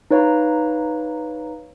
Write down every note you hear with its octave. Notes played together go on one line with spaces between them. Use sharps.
D#4 B4 C#5 F5 A#5